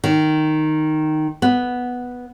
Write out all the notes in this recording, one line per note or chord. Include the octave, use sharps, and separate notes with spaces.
D#3
B3